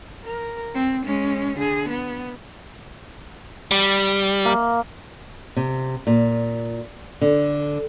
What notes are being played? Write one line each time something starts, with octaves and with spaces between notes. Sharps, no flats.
A#4
C4
G#3 C#4
D3 G#4
B3
G3
A#3
C3
A#2
D3